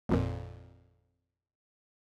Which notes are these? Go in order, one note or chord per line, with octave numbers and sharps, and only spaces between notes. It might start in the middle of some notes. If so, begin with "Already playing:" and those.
G#1 F2 A#2